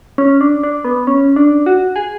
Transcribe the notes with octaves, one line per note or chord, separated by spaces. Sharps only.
C#4
D4
D4
B3
C#4
D4
F#4
G#4